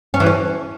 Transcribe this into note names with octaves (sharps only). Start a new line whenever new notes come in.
C#4
E3
C#4